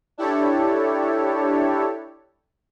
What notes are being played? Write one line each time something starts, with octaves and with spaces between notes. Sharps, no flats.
D4 E4 G4 A4 C#5